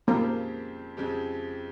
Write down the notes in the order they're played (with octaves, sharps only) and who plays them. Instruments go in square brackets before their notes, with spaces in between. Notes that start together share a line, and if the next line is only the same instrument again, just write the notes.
[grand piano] F2 C#3 G#3 C4 G4 [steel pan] A#3 A#4
[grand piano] F2 C#3 G#3 C4 G4